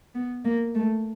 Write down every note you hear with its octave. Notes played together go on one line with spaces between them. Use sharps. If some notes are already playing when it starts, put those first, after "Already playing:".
B3
A#3
A3